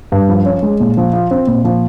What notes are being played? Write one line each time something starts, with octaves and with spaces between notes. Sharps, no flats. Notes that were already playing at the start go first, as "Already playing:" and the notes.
G2
F3
C#4
G#3
A#2
F3
F4
C4
A#2
F3